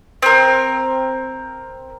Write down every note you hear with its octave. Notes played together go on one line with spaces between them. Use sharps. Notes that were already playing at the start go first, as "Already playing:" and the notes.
C4 A#4